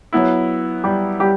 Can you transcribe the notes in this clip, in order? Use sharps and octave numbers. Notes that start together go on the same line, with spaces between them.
F#3 B3 E4
G3 G4
G3 G4